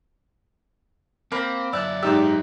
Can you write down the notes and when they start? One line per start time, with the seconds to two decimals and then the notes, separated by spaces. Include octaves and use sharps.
1.32 A#3 C4 B5
1.73 F#2 E4 D5 E6 F#6
2.03 G#2 D#4 G4 E6